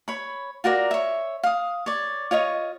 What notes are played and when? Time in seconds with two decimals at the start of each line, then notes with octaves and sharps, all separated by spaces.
0.08 C#5 B5
0.64 F4 F#4 A#4 D5
0.91 C#5 E5
1.43 F5 D#6
1.86 C#5 D5
2.31 F4 C#5 D#5 C#6